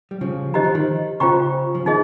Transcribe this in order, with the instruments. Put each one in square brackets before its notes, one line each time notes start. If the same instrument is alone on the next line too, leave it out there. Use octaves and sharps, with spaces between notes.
[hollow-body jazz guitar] G3
C#3 F3
[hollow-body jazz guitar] D#3 [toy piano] G4 C5 D#5 A#5
[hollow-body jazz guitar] F3
D#3
[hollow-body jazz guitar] C#3 [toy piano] F4 C5 G5 A#5 C#6
[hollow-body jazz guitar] F3
[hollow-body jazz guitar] D#3 [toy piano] D#4 G#4 D#5